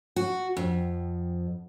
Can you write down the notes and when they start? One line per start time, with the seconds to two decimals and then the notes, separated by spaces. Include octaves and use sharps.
0.16 F#4
0.57 F2